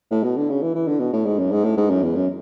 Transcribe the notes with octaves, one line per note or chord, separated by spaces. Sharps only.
A2
B2
D3
C#3
E3
E3
D3
B2
A2
G#2
F#2
G#2
A2
G#2
F#2
E2
F#2